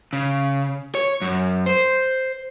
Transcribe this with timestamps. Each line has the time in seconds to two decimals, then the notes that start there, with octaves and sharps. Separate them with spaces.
0.13 C#3
0.95 C#5
1.22 F#2
1.66 C5